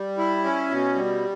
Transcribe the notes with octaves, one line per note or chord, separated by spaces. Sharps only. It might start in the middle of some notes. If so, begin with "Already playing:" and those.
Already playing: G3
E4
C#4
B2
G3